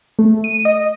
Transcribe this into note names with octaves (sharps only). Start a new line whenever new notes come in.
A3
D#7
D#5